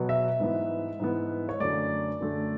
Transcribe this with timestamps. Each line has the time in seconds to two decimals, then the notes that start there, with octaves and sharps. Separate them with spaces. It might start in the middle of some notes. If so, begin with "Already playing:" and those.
Already playing: B2 F#3 B3
0.09 E5
0.40 G#2 E3 B3
1.00 G#2 E3 B3
1.49 C#5
1.60 F#2 D3 A3 D5
2.21 F#2 D3 A3